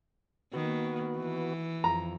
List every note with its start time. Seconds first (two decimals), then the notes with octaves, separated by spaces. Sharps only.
0.53 D#3 A#3 B3 F#4
1.17 E3
1.84 F2 A#5